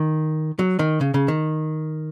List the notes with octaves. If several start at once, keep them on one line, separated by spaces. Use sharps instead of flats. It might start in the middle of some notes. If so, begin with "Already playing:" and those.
Already playing: D#3
F#3
D#3
C#3
C#3
D#3